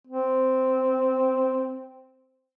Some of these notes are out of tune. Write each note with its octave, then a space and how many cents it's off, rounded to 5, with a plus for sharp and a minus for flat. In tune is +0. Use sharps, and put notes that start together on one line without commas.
C4 -5